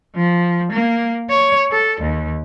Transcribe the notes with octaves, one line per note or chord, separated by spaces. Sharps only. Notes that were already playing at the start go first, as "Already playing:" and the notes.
F3
A#3
C#5
A4
D#2